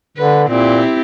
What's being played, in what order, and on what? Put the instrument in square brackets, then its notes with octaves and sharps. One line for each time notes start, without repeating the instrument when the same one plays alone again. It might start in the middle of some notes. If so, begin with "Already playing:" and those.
[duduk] D3 [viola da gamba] B4
[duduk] A#2 [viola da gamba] C4 E4 G4